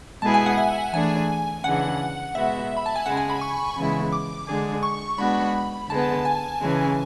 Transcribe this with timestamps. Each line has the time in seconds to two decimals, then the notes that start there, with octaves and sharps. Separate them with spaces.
0.22 B2 G#3 B3 E4 G#4 A5
0.34 G#5
0.46 F#5
0.58 E5
0.93 E3 A3 D4 G#4 G#5
1.64 C#3 E3 G#3 D4 F#5
2.35 B2 G#3 B3 F#4 E5
2.77 B5
2.86 A5
2.96 G#5
3.06 C#3 G#3 C#4 F#5
3.17 G#5
3.30 B5
3.41 C#6
3.77 C#3 E3 G#3 B3 E4
4.12 D6
4.47 D3 G#3 D4 G#4
4.83 C#6
5.18 G#3 B3 D4 F#4 B5
5.89 D3 G#3 B3 A5
6.25 G#5
6.61 C#3 E3 G#3 C#4